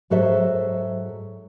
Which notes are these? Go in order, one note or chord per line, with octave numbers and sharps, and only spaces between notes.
G#2 F#3 A4 C5 E5